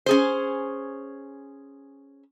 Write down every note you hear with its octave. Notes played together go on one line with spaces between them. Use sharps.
C#4 G#4 C5